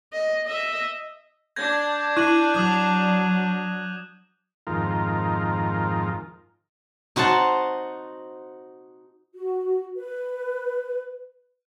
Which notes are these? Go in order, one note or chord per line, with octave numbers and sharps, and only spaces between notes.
D#5
D#5 E5
D4 G6 G#6 A#6
E4 F#6 D#7 F#7
F#3 D6 D#6 F#6
F2 G#2 D#3 F4 A#4
D#4 F#4 C5 F#5 A5
F#4
B4